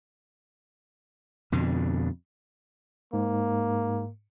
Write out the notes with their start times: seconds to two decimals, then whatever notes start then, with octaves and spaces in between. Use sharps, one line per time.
1.52 F2 B2 D3
3.13 G#2 A#3